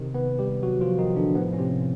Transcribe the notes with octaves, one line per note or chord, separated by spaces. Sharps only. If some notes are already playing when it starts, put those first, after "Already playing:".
Already playing: C3 D#3
B3 B4
G3 G4
F#3 F#4
F3 F4
D#3 D#4
D3 D4
A2 F3 B3
C#4
C3 C4